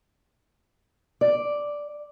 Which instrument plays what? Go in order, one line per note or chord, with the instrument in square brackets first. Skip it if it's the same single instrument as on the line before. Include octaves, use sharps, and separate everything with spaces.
[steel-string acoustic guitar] D5